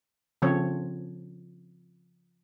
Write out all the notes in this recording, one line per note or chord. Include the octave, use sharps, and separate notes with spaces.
C#3 F3 C4 A4 C#5